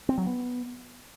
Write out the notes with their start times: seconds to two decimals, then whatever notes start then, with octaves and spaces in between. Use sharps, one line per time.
0.09 C4
0.18 F#3
0.27 B3